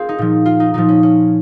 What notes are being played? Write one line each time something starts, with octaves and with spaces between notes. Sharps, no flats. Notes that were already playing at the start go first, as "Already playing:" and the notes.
Already playing: C4 F4 G#4 A#4
D#4
A#2 F3
F4
D#4
A#2 F3 D#4
C#4
C#4